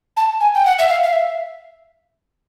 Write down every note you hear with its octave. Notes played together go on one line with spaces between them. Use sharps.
A5
G#5
G5
F#5
E5
F5
F5
E5